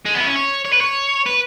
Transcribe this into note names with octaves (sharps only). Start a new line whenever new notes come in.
G#3
B3
E4
C#4
C#5
C#5
B4
C#5
B4